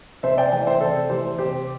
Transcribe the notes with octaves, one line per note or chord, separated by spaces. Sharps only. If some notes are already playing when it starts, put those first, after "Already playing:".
C3 C5 E5
D5 G5
E3 A3 D5 G5
C5 E5
C3 A4 D5
E3 A3 G4 C5
C3 G4 C5